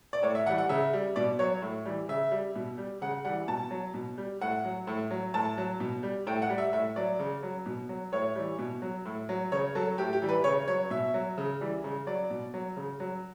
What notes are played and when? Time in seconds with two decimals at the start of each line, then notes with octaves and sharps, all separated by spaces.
0.13 D5
0.23 A2 C#5
0.35 E5
0.46 E3 F#5
0.50 G3
0.58 F#5
0.69 C#3 E5
0.93 G3
1.16 B2 D5
1.39 F#3 C#5
1.62 A2
1.85 E3 G3
2.09 C#3 E5
2.31 G3
2.55 B2
2.78 G3
3.01 C#3 F#5
3.25 E3 G3 F#5
3.48 B2 A5
3.71 F#3
3.94 B2
4.18 G3
4.41 A2 F#5
4.65 F#3
4.87 A2
5.11 F#3
5.34 A2 A5
5.58 F#3
5.80 B2
6.03 G3
6.27 A2 G5
6.42 F#5
6.50 G3
6.58 E5
6.73 A2 E5
6.96 F#3 D5
7.19 C#3
7.43 F#3
7.66 B2
7.89 F#3
8.12 A2 C#5
8.35 E3 G3
8.59 B2
8.82 F#3
9.06 A2
9.29 F#3
9.52 C#3 C#5
9.75 F#3 A4
9.98 A2 G4
10.13 G4
10.22 E3 G3
10.29 B4
10.44 C#3 C#5
10.68 F#3 C#5
10.90 B2 E5
11.14 F#3
11.38 C#3
11.61 E3 G3
11.84 C#3
12.07 F#3 D5
12.30 B2
12.54 F#3
12.77 C#3
13.00 F#3